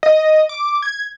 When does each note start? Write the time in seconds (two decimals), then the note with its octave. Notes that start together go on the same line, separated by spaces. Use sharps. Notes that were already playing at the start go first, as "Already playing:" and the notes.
0.03 D#5
0.49 D6
0.82 G#6